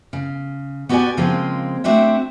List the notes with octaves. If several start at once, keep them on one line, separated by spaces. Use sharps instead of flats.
C#3
B3 F#4 G4 B4 D5 G#5
C#3 F3 G#3 A#3 C4 G#4
A3 C4 D4 F#4 E5